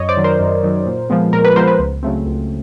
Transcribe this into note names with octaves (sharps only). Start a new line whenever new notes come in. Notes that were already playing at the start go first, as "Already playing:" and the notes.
Already playing: F#2 C#5 D#5
C5 D5
D#3 F#3
A#4 C5
F#2
D#3 F#3
A#2
F3 G#3 B3
A#2 A#4
B4
F3 G#3 B3 A#4 C5
B4
C#2
C#3 F#3 A3 C4
C#2